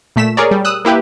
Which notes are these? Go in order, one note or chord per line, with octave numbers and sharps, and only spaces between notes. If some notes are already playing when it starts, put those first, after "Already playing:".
A#2 A3 B6 E7
G#4 A#4 C#5 D5
G3
D#6 E6 F#6
A#3 E4 G4 B4